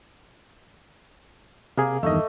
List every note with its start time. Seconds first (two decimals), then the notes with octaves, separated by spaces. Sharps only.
1.77 C3 A#3 G#4
2.03 E2 G2 D#3 A3 D#5